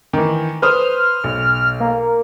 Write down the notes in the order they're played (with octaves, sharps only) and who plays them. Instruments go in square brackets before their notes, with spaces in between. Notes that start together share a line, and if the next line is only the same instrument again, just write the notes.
[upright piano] D#3 E3
[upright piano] B4 C5 D#6 [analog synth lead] F6
[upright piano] B1
[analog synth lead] A#3